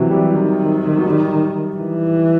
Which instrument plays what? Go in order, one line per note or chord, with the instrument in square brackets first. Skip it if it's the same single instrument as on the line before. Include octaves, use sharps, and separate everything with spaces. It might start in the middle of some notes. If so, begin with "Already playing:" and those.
Already playing: [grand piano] C3 F#3 [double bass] E3
[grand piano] G3
[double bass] D#3
[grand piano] F#3
G3
[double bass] E3